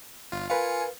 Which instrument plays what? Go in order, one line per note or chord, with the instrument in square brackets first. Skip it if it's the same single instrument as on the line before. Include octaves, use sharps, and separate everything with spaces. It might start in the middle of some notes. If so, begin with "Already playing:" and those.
[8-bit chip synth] G1 F4
[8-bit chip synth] F4 C#7 [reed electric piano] A#4 B4 F5 [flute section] G#5